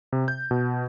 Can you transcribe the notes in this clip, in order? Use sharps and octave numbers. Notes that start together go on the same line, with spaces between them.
C3
G6
B2